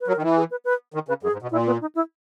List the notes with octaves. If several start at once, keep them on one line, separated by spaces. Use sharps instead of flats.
B4
F#3 A#4
D#3
E3
G#4
B4
B4
D#3
C#3 B4
F#2 G#4
G#2
B2
A#2 E4
B3
D#4
E4